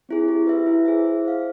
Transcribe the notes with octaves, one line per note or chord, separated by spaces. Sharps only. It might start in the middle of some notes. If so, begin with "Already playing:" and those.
C4 E4 G#4
G4
B4 E5
E4
G#4 C5 E5
G#4
C5 F5